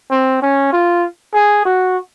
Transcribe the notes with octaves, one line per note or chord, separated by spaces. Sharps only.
C4
C#4
F4
G#4
F#4